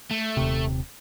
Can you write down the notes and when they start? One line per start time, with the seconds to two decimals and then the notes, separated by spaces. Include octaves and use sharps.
0.11 A3
0.37 D#1 C3